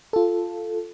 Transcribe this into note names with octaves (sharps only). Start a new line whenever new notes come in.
F4 A4